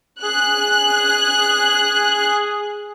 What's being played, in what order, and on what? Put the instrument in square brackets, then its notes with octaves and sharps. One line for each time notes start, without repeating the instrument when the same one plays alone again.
[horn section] G#4 [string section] F#6